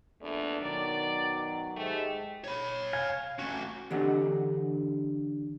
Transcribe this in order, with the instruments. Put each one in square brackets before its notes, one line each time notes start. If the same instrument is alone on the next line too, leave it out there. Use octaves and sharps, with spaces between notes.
[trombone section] A#1 A3 D4 [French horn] E2
[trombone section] B2 D#3 F#3 [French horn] D5
[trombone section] G#2 G#3 G4 [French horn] A3
[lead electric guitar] C#5 B5
[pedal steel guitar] F5 G#5
[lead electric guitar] A3 C#4 [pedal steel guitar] F#4
[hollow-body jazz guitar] D3 E3 D4 G4 D#5 F#5